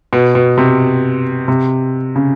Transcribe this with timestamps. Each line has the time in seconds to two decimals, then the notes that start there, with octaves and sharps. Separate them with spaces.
0.13 B2
0.35 B2
0.58 C3
1.48 C3
2.16 C#3